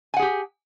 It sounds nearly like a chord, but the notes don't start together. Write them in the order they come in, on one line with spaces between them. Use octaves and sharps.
G#5 F#5 G#4 G4